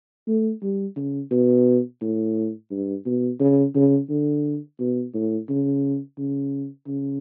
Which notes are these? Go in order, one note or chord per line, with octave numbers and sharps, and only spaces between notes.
A3
G3
C#3
B2
A2
G2
B2
C#3
C#3
D3
B2
A2
C#3
C#3
C#3